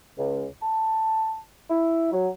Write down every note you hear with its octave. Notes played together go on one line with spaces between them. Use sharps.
C#2
A5
E4
F#3